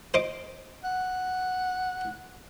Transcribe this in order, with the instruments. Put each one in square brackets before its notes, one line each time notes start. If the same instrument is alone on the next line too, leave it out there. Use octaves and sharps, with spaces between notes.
[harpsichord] C5 D#5 D6
[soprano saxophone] F#5